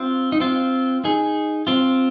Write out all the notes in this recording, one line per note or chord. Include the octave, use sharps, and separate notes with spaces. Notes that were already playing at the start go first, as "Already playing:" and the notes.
Already playing: C4 F4
D#4
C4 F4
D#4 G#4
C4 F4